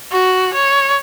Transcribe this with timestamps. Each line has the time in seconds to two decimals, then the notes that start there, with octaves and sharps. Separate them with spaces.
0.12 F#4
0.54 C#5